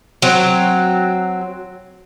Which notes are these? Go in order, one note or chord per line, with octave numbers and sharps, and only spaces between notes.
F#3 C4